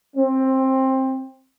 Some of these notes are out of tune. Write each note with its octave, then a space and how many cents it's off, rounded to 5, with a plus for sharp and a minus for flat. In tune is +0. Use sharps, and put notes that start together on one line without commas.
C4 +15